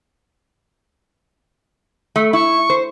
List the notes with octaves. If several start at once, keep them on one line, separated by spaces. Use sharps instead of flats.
A3
E4 C#6
C5